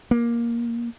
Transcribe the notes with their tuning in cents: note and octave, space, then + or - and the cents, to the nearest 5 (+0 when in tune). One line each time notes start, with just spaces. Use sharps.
A#3 +10